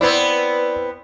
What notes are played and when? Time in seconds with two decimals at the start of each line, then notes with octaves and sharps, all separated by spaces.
0.01 B3 C4 E4 D5 B5